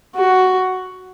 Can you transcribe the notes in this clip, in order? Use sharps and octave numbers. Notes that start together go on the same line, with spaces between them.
F#4